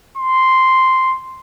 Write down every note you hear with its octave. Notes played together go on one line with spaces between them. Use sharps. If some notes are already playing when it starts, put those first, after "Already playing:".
C6